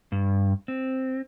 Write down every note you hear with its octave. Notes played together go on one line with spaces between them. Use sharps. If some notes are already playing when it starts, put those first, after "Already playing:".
G2
C4